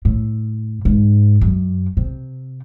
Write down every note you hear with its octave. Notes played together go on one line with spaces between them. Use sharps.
A2
G#2
F#2
C3